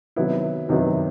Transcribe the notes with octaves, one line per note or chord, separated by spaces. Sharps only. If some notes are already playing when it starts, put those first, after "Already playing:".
C3 D#3 F#3 B3 E4
C3 D#3 F#3 B3 E4